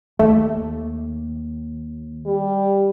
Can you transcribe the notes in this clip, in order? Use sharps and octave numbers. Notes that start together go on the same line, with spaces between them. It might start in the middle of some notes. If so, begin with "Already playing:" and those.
D#2 A3
G3